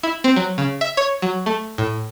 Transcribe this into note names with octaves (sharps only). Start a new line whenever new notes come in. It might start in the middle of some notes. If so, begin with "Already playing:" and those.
E4
C4
F#3
C#3
E5
C#5
F#3
A3
A2